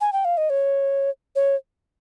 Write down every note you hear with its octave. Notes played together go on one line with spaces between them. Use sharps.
G#5
G5
F5
D#5
C#5
C#5